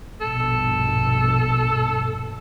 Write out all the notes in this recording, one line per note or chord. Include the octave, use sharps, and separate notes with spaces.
A#1 G2 B2 A4